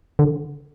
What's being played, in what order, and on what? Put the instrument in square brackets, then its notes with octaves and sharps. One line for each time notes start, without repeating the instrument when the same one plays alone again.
[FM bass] D3